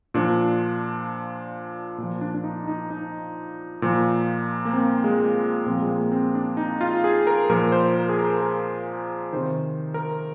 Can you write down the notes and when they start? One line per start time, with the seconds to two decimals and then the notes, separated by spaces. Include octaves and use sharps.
0.14 A#2 F3 D4
1.98 A#2 F3
2.21 D4
2.34 D4
2.44 D#4
2.67 D#4
2.90 D#4
3.82 A#2 F3
4.65 A#3
4.73 C4
5.04 G#3
5.35 A#3
5.66 A#2 F3 C4
5.82 G#3
5.89 A#3
6.12 C4
6.35 D4
6.57 D#4
6.81 F4
7.04 G#4
7.27 A#4
7.50 A#2 F3 A#4
7.72 C5
7.95 A#4
8.09 G#4
8.19 A#4
8.41 A#4
9.33 C3 D#3 C5
9.94 A#4